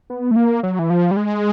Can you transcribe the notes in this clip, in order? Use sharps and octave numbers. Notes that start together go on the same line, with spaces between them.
B3
A3
A#3
F#3
E3
F3
G3
G#3